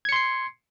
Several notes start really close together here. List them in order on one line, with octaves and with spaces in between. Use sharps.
G#6 C#7 C6 C7